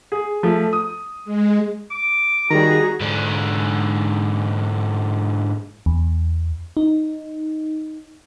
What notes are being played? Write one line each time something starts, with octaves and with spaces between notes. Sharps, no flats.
G#4
F3 A3
D#6
G#3
D6
D#3 G3 F#4 G#4 A#5
G#2 D3
E2
D#4